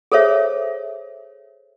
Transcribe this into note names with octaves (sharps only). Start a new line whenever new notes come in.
G#4 A4 C5 C#5 E5